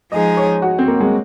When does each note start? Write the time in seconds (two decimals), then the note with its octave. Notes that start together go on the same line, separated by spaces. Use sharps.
0.12 F3 G#3 D#4 G#4 D#5
0.37 C#5
0.62 F#4
0.79 C4
0.88 A#3
1.00 G#3